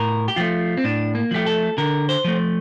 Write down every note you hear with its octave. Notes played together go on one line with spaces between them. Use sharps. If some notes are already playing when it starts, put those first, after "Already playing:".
Already playing: A2 A#4
G4
F3 A3 F4
C4
A2 D4
A#3
F3 A3 G4
A4
D3 A#4
C5
F3 A3